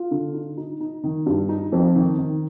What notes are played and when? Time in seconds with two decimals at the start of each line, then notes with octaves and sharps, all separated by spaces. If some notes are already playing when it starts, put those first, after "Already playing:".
Already playing: F4
0.11 D3
0.34 D#4
0.57 D#4
0.81 D#4
1.03 D#3
1.26 G2
1.49 D#4
1.72 F2
1.95 D#3
2.18 D#3